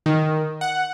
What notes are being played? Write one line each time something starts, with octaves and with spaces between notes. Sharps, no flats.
D#3
F#5